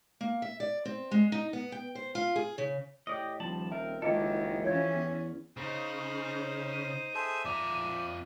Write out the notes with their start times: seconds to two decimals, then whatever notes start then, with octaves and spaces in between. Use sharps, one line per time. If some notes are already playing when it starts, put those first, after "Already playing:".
0.21 A#3
0.42 E5
0.60 D5
0.85 C4
1.11 G#3
1.32 D#4
1.53 B3
1.72 G5
1.95 C5
2.15 F4
2.36 G#4
2.58 C#3
3.07 A2 G4 D5 D#5
3.40 D#1 F3 G3 A5 F#7
3.72 C4 A#4 E5
4.02 F#1 D#3 G#3 E4 F4 G4 A4 D#5
4.64 F2 E3 C#4 C#5 G#6
4.94 E2
5.57 C#3 D#4 C5
6.73 D#7
7.15 G#4 A4 C5 E5
7.45 F2 D5 A#5